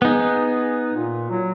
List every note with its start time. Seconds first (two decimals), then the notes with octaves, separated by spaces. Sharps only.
0.02 B3 D#4 G#4
0.93 A#2
1.30 F#3